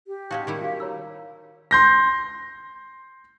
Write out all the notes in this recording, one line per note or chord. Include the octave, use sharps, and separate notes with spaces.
G4
G#3 C#4 D#4 F#4 F5 D#6
D#3 G3 E4
F#4 F5
C#5 A#5 E6
C6 G6 A#6